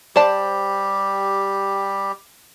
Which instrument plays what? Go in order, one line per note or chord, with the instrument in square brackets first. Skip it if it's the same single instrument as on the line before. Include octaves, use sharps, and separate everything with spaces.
[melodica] G3 G4 [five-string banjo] C5 D5 A5